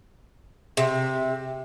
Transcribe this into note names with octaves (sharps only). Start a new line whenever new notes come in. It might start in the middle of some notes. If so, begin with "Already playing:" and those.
C3